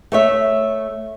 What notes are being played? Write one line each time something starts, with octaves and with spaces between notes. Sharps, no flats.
A3 C#5 E5